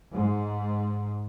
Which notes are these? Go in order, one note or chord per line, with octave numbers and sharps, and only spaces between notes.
G#2